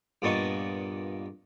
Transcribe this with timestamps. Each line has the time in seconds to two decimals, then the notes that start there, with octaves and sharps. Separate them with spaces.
0.22 G2 A#2 B3 D#5 A5 C#6